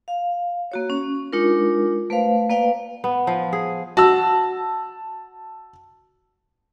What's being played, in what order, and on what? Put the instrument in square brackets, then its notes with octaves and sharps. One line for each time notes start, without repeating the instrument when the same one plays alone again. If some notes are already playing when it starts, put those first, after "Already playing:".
[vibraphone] F5
A#3 F#4 C#5
C#4
G#3 D4 D#4 F4 A#4
A3 B4 C5 F5
A#3 B4 D5 F5 G5
[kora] B3
F3
G#4
[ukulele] F#4 [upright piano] A5 E6